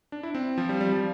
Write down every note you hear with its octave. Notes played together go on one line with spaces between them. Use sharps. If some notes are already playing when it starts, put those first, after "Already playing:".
D4
E4
C4
F3
G3
G3
F3